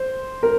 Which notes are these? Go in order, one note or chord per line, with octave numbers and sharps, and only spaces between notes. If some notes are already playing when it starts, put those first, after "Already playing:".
Already playing: C5
A#4